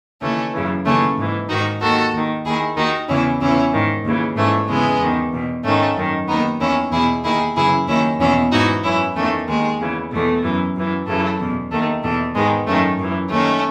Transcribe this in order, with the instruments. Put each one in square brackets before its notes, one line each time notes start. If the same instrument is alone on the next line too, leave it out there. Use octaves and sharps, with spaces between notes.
[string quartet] D#2 C#3 E3 A3 C#4
F#2 C#3 E3
D#2 C#3 E3 A3 C#4
G#2 E3
G#2 D#3 D#4 F#4
D#2 D#3 F#4 A4
D#2 D#3
D#2 D#3 E4 G#4
D#2 D#3 D#4 F#4
E2 C#3 E3 C#4 E4
E2 C#3 E3 C#4 E4
G#2 D#3
D#2 C#3 E3
G#2 E3 A3 C#4
E2 C#3 E3 G#3 B3
E2 D#3
E2 B2
G#2 D#3 A3 C#4
F#2 D#3
D#2 D#3 B3 D#4
E2 D#3 C#4 E4
E2 B2 E4 G#4
D#2 D#3 E4 G#4
F#2 C#3 E3 E4 G#4
D#2 D#3 C#4 E4
E2 B2 C#4 E4
G#2 E3 D#4 F#4
F#2 E3 C#4 E4
E2 D#3 A3 C#4
D#2 D#3 G#3
E2 C#3 E3
E2 B2 A3
F#2 E3
F#2 E3
F#2 C#3 E3 A3
E2 B2
D#2 D#3 A3
E2 B2 A3
G#2 D#3 G#3 B3
F#2 D#3 A3 C#4
F#2 E3
D#2 D#3 A3 C#4